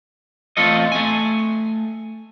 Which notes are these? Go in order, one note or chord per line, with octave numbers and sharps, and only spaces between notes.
E2 A3 C4 F4 A4 D#5
A3 G#5